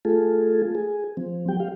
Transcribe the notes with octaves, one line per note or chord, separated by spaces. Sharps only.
A3 F4 G#4 A4
G#4
F3 C4
F#3 G4 G5
G4 F5